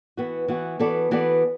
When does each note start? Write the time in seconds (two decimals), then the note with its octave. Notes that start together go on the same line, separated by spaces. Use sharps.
0.17 E3 B3 F#4
0.48 E3 B3 F#4
0.79 E3 B3 F#4 A4 D5
1.11 E3 B3 F#4 A4 D5